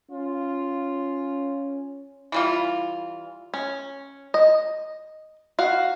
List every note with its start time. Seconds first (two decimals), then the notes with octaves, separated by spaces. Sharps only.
0.11 C#4 F4
2.32 E3 G3 F4
3.54 C#4
4.34 D#5
5.59 F#4 F5